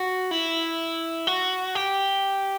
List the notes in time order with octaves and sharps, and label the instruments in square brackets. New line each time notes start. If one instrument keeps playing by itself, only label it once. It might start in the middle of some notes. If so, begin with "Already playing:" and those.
Already playing: [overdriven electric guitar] F#4
E4
F#4
G4